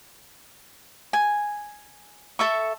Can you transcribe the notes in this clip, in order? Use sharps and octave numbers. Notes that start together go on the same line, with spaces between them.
G#5
A4 E5 C#6